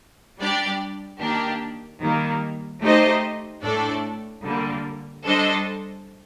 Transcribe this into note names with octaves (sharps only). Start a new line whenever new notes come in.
G3 D4 G4 D5
D#3 A#3 D4 G4
D#3 G3 A#3
A3 D#4 G4 C5 D#5
A2 A3 D4 A4 D5
D3 G3 A#3
G3 D4 A4 C5 D#5